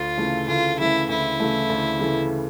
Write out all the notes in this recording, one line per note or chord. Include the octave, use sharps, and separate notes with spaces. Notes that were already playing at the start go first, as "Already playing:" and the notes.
Already playing: D2 F4
C#3 E3 A3
D2 F4
C#3 E3 A3 E4
D2 E4
C#3 E3 A3
D2
C#3 E3 A3